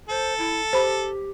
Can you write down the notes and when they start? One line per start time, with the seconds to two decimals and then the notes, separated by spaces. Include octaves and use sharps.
0.10 A4 C5
0.38 E4
0.73 G4 C5 B5